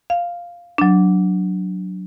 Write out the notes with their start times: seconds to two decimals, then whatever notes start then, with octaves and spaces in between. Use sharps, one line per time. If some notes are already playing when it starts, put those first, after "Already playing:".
0.10 F5
0.78 F#3 D4